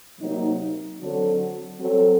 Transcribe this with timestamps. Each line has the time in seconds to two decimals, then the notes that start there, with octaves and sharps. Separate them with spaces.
0.19 C3 F#3 A#3 D#4
1.00 D3 F#3 C4 F#4 A4
1.79 F#3 C4 F#4 A4